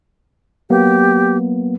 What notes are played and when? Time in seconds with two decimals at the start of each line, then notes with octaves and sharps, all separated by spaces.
0.70 F#3 A#3 B3 G4